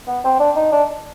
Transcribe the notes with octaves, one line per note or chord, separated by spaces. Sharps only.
B3
C4
D4
D#4
D4